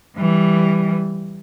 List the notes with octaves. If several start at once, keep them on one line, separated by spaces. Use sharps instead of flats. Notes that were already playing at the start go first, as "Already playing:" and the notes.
E3 G3